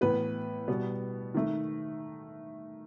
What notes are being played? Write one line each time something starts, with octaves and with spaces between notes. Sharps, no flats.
A2 E3 B3 B4
B2 G3 B3
D#3 A3